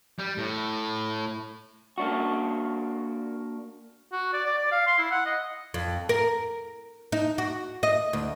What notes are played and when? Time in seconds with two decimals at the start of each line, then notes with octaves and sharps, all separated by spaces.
0.19 G3
0.38 A2
1.98 A#3 D4 F#4
4.13 F#4
4.33 D5
4.46 D5
4.58 D5
4.72 F5
4.87 C6
4.99 E4
5.11 F#5
5.26 D#5
5.74 F2
6.09 A#4
7.12 D#4
7.38 F#4
7.83 D#5
8.13 D2